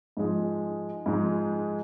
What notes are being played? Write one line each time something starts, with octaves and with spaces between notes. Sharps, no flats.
G#2 F3 G#3
G#2 F3 G#3